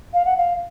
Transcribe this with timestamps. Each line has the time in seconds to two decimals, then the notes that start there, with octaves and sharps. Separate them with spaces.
0.13 F5
0.25 F#5
0.37 F5